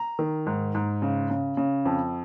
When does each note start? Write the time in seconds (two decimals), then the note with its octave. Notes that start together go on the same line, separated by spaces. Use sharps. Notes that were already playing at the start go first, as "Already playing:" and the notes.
Already playing: A#5
0.19 D#3
0.46 G#2
0.75 G#2
1.02 C#3
1.30 C#3
1.57 C#3
1.85 F2